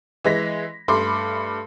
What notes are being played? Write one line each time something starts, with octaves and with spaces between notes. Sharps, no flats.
E3 G#3 A#6 B6
G2 A3 B5 C6 D6